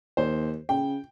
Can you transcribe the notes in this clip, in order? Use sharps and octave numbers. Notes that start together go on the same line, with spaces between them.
D#2 C5
C#3 G5